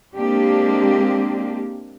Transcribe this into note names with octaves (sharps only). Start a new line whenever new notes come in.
G#3 A#3 C4 D4 G4